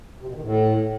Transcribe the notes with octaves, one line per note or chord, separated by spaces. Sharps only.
C3
B2
D#3
A2